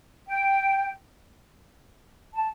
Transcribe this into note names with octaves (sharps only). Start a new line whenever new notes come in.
G5
A5